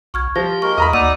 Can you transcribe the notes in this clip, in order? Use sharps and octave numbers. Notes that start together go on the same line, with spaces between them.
B1 C#6 F6 G#6
F3 F4 G4 A#6
G#3 A#3 A#4 C#6
E2 D#5 A#5 B5
D2 A#3 D#4 F#4 D5 F#5 E6 D#7